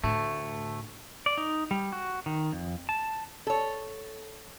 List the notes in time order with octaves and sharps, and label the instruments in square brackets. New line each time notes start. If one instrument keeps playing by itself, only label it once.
[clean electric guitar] D2 A3 [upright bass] A2
[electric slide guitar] D5
D#4
G3
F#4
D#3
F2
A5
[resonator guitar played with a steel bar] A4 C#5